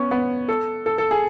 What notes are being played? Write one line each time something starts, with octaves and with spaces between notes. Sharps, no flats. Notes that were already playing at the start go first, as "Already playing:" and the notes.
Already playing: B3 C#4
B3
A4
A4
A4
G#4